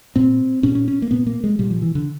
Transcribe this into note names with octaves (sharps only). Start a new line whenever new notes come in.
A#2 C4
A#2 C#4
C#4
C#4
A#3
A#2 B3
A#3
G#3
A#2 G3
F3
E3
D3